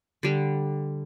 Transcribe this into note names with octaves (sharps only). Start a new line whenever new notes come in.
D3 G3